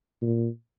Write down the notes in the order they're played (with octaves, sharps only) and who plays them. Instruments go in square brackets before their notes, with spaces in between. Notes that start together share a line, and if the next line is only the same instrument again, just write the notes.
[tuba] A#2